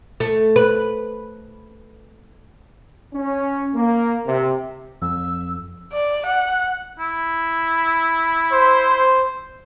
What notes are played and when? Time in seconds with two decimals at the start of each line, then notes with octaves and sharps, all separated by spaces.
0.20 A3
0.56 B4
3.14 C#4
3.75 A#3
4.26 C3
5.02 F2 E6
5.92 D5
6.26 F#5
6.99 E4
8.51 C5